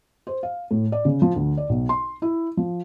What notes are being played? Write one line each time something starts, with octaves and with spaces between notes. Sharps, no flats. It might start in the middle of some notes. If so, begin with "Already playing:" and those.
C5
F5
A2
D5
C#3
F3
D2
D5
B1
C6
E4
F3